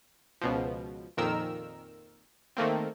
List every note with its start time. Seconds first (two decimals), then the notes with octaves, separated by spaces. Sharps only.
0.41 C#2 B2 F3
1.17 F2 A#2 D#3 A#4 E6
2.57 D#3 A3 A#3 C4